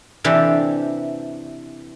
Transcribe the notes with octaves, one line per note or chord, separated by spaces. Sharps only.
C3 E3 D4 G4 A4